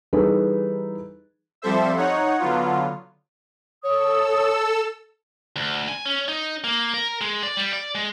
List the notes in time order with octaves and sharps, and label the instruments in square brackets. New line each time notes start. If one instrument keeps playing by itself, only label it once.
[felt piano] E3 G3 D#4 G#4 A4 B4
[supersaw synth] F3 G3 C4 A4 C5 E5
D#4 C#5 F#5
D3 F#3 B3 F4
[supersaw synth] A4 E6 [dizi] C#5 [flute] D#6
[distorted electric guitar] D2
G#5
C#4
D#4
A#3
A#4
G#3
D5
G3
D5
G#3